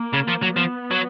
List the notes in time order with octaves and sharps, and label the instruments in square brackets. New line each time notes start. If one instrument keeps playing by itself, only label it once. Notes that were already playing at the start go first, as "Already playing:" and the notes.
Already playing: [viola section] A#3
[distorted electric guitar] C#3
F3
F#3
[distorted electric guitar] F3 [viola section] B3
[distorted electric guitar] F#3